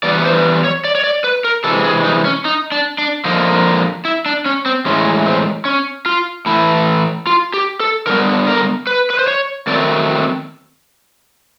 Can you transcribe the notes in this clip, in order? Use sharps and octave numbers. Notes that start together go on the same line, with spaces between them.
E3 G3 B3 D5
C5
C#5
D5
C#5
D5
B4
A#4
C3 E3 G#3 A4
G#4
D#4
C#4
D#4
D4
D4
D3 F3 A#3 D#4
E4
D4
C#4
C4
A2 E3 G#3 C#4
C4
C#4
F4
A2 E3 A3 E4
F4
G4
A4
D3 G3 B3 A#4
A#4
B4
B4
C5
C#5
D#3 F#3 A3 C4 D5